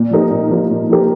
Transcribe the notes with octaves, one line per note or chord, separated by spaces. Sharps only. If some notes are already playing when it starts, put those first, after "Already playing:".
Already playing: A#2
F3 D#4 G4 A#4
A#2
F3 D#4 G4 A#4
A#2
F3 D#4 G4 A#4